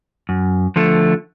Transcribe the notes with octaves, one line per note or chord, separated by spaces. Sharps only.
F#2
D3 F3 A3